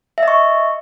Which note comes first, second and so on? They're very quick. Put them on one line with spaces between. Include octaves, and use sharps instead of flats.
E5 D#5 C#6